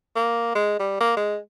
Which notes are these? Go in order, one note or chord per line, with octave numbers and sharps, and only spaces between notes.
A#3
G#3
G3
A#3
G#3